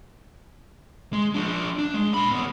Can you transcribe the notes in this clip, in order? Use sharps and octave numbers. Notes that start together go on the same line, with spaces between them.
G#3
F3 D4
D4
G#3
A#2 B5
D#2 B3